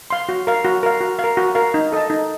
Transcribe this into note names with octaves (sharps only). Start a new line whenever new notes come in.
F5 C6
F#4
A#4 F5
F#4
A#4 F5
F#4
F5
A#4
F#4
A#4 F5
D#4
A4 D#5 A5
D#4